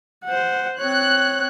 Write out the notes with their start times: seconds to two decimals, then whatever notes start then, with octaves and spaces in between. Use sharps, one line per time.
0.25 C5 F#5
0.79 C4 C#5 F#6